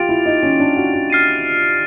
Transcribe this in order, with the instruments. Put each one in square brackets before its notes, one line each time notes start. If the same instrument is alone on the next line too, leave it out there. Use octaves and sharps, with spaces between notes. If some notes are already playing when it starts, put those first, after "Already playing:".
Already playing: [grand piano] F4 G4 [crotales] A6 D7 F7
[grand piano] E4
D#4
C#4
D4
F#4
F#4
[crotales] F6 A6 C7 D#7